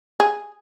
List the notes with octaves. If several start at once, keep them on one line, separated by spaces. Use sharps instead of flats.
G#4